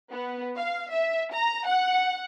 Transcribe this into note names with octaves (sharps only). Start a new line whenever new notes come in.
B3
F5
E5
A#5
F#5